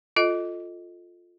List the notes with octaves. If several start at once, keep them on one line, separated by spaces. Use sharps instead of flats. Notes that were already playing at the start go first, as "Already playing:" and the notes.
F4 A4 D#5